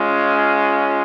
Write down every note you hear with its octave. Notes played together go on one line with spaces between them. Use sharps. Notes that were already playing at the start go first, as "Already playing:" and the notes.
Already playing: G#3 C#4 F4